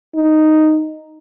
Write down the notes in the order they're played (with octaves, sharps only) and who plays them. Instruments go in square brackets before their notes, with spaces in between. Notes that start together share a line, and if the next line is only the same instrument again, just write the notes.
[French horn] D#4